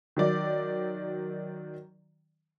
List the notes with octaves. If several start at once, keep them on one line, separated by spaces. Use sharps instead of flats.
D#3 F#3 D5